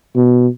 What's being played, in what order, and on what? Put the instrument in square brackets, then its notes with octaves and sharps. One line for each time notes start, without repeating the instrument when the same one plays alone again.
[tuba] B2